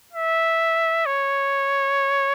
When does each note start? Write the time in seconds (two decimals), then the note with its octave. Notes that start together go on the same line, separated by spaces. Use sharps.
0.13 E5
1.06 C#5